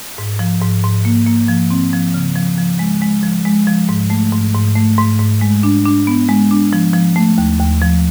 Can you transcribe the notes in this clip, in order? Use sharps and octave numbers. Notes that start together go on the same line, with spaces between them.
G#2
F3
G#2
G#2
A#3
A#3
F3
C4
F3
C#3
F3
F3
G#3
G#3
F3
G#3
F3
G#2
A3
G#2
G#2
A3
G#2
G#2
G#3
D4
D4
B3
G#3
D4
F3
F3
A3
D#2
D#2
F3